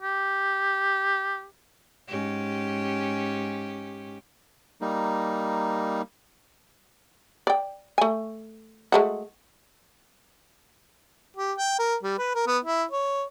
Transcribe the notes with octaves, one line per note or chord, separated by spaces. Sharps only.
G4
G#2 C#4 G4
G3 A#3 D#4
D5 G5
A3 G#5
G#3 A3 F#4
G4
G5
A#4
G3
B4
A#4
B3
E4
C#5